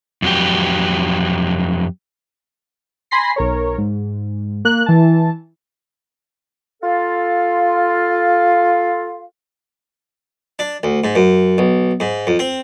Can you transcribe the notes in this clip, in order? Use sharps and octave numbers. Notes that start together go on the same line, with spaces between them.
F2 F#3 G4
G#5 B5 C6 A#6 C7
B1 A#4 C#5
G#2
A#3 F#6
E3 A5
F4 A4 F5
D4
D2
G#2
F#2
B1
G#2
F2
C4